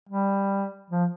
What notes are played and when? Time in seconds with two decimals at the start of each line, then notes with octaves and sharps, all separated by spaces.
0.09 G3
0.90 F3